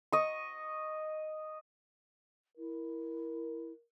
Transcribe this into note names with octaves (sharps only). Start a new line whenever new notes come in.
D#5 C#6
E4 A#4